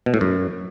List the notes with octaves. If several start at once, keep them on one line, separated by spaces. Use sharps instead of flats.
B2
A2
F#2